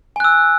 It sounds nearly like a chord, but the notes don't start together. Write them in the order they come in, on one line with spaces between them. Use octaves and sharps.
G#5 F#6 E6